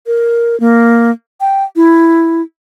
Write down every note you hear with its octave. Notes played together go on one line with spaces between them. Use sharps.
A#4
A#3
G5
E4